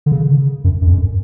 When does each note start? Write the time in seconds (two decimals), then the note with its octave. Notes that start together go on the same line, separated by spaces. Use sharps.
0.06 D3
0.12 C#3
0.64 F#2
0.82 F#2
0.87 F2
0.93 F#2